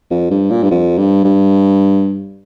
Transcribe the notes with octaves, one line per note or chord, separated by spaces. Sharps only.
F2
G2
A#2
G2
F2
G2
G2